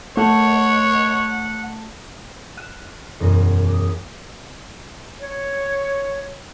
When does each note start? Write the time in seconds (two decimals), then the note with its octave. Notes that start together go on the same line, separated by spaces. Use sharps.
0.17 A3 C#5 F#5
2.57 F6 F#6 D#7 E7
3.20 E1 F#2 A#6
3.67 D6 D#6
5.21 C#5